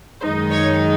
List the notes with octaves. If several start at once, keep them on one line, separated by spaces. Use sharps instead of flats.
F#2 D#3 G#3 D#4 C5
C#5